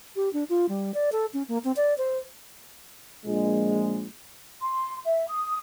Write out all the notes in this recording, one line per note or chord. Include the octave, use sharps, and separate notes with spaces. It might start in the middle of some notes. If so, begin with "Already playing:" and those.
G4
D4
F4
G3
D5
A4
C#4
A#3
C4
D5
C5
A#1 G#3
C6
E5
D#6